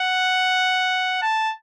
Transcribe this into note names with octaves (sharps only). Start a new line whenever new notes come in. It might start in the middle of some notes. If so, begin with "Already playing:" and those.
Already playing: F#5
A5